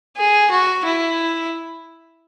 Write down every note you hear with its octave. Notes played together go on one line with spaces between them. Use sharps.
G#4
F#4
E4